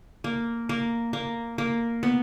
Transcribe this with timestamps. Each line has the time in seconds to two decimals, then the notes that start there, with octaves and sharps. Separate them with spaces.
0.24 A#3
0.69 A#3
1.13 A#3
1.58 A#3
2.03 B3